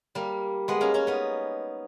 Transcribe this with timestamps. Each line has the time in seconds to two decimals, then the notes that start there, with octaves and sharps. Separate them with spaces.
0.15 G3 A#3
0.68 G#3 B3
0.81 A#3 C#4
0.94 A#3 C#4
1.07 B3 D#4